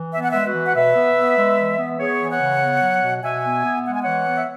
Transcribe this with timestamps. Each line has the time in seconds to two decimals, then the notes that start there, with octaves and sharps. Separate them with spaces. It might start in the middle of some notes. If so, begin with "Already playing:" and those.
Already playing: E3
0.14 B3 E5
0.23 F#5
0.30 G#3 B4 E5
0.45 F#4 B4
0.55 E3
0.65 F#5
0.76 B2 B4 E5
0.96 B3
1.17 B3
1.38 G#3
1.58 E3
1.79 B3
2.00 B3 G#4 C#5
2.21 E3
2.31 C#5 F#5
2.41 C#3
2.62 B3
2.82 F#3
3.03 B2
3.23 B2 E5 G#5
3.44 B3
3.65 B3
3.86 G#3 F#5
3.94 G#5
4.02 E3 C#5 F#5
4.27 B3
4.36 E5